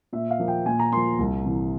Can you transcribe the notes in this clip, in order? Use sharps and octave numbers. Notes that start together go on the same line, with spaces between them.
A#2 E5
F5
F3 A#3
G5
A#2 G#5
A#5
F3 A#3 C6
C2
C3 E3